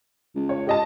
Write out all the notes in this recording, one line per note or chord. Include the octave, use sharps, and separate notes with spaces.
C#2
C#5
G4 D#5 A5